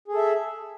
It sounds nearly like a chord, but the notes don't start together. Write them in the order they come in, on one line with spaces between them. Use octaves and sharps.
G#4 A4 E5